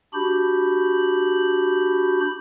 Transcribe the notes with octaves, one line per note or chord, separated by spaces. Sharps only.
D4 F#4 G4 B5 G6